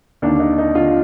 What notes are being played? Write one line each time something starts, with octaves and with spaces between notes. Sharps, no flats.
D#2 D3 D4
D#4
D#4
D3 F4